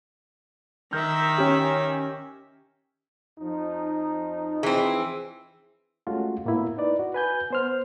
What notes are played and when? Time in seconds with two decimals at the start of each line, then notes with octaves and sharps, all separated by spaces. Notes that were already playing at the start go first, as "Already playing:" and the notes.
0.93 D#3 E5 F6 G6
1.38 C#4 G4
3.39 F2 F3 D#4
4.63 E3 C4 G#4
6.07 G#3 A3 C#4 F4 F#4
6.45 A2 A#3 B3 E4
6.78 D#4 E4 B4 D5
6.99 F#4
7.14 B4 G#5 G6
7.51 B3 C5 F6